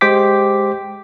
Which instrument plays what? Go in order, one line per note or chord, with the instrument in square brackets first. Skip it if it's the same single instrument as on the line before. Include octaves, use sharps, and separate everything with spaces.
[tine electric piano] G#3 G4 C5 G5 D6 B6